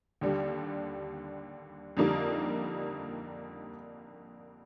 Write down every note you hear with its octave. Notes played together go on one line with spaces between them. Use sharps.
D#2 D3 G3
F2 D3 G3 A#3 D#4